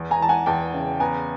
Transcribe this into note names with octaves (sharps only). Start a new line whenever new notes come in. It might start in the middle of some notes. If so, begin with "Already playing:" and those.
Already playing: E2
G#5 A#5
E3 A5
F#5 G#5
E2 G5 A5
C#3
B3 G#5 A#5